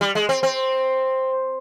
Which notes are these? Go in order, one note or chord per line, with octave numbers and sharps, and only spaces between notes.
G3
G#3
C4
C4